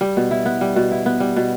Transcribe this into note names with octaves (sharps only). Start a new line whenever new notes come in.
G3
B2
E4
B3
G3
B2
E4
B3
G3
B2